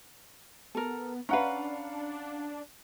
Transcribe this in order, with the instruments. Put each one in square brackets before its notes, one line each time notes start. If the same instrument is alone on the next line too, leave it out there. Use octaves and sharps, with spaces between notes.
[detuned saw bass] B3 [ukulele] A4 A#4
[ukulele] C#4 B4 [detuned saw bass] D4 [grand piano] F5 F#5 A#5